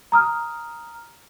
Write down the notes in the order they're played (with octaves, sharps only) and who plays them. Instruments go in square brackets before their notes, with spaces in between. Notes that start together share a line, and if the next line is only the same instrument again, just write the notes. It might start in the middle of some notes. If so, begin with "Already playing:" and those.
[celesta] A#5 D#6 F6